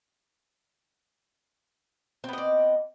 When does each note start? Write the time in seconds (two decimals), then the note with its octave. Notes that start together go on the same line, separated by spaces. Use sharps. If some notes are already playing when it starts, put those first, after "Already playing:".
2.24 C4
2.28 B3
2.33 D#5
2.38 D5